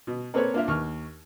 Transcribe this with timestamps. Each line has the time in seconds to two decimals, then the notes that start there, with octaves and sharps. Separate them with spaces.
0.07 B2
0.34 A#3 C4 A4 B4 C#5
0.54 A#3 D4 F4 A#4 E5
0.68 D#2 C#6 F6